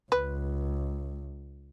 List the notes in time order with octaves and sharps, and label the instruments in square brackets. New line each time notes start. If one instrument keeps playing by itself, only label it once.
[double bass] C#2 [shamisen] B4